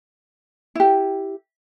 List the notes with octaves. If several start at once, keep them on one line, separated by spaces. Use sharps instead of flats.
E4 G4